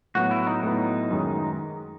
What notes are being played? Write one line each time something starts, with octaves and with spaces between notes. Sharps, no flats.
A2 F#3 B3 F#4
E4
D#4
A2 F#3 B3 D#4
F#2 D#3 G#3